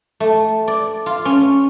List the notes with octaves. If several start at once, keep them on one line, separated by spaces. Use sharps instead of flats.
A3
D5
F4
C#4